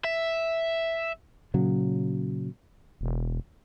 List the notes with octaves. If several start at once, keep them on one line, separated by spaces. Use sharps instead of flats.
E5
A#2 C#3 F#3
E1